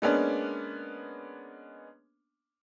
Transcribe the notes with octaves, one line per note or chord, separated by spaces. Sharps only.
G#3 A#3 B3 C#4 D4